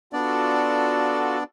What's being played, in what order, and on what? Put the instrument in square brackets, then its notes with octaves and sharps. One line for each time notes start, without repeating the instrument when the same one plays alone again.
[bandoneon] B3 D4 D5 [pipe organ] F4 F#4 A4